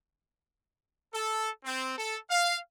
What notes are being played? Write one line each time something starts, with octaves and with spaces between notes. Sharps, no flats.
A4
C4
A4
F5